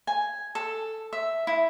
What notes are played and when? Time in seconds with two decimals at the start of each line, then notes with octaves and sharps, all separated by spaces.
0.07 G#5
0.55 A4
1.13 E5
1.47 E4